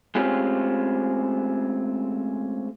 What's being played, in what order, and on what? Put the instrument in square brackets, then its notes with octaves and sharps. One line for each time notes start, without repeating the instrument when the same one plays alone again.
[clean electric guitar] G#3 A3 C4 C#4 F4 G4